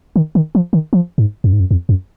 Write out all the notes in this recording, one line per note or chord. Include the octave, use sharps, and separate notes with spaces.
D#3
D#3
F3
D#3
F3
G#2
F#2
G#2
F#2
F2
F#2